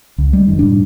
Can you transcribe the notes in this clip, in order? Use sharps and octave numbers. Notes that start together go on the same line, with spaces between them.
C#2
G3 G#3
F1 F#2 D#3
E1 A2 G3 D4